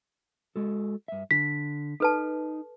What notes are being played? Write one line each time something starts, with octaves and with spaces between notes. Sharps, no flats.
G#3 F#4 A4
G2 E5
D3 B6
D#4 A4 B4 A5